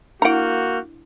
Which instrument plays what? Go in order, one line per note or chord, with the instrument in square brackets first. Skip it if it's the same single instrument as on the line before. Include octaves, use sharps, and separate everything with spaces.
[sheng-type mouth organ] A#3 F6 G6 [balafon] D4 E4 [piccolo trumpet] F#4 [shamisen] F#5 A#5